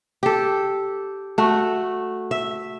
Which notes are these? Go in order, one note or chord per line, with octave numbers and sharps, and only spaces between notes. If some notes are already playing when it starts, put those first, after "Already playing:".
G4 A4
A3 F#4
E5